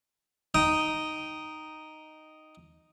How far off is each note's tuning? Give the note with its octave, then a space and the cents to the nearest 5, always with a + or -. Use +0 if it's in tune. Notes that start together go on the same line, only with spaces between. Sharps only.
D#4 +0 G5 -15 D#6 +0